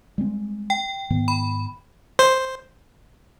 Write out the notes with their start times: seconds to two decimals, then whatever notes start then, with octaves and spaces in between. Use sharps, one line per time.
0.18 G3 G#3 C4
0.70 G5
1.10 G#2 D#3 B3
1.28 B5
2.19 C5